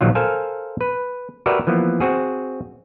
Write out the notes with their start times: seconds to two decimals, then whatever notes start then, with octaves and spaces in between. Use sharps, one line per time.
0.01 A#1 D#3 F#3 F4
0.15 A4 A#4 C5 F5 G#5
0.81 B4
1.46 F#4 G4 A#4 B4 D5 E5
1.67 E3 F3 A#3 B3
2.00 C4 F#4 G#4